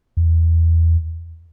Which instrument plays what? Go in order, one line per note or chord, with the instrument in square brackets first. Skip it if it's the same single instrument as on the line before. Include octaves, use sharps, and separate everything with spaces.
[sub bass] E2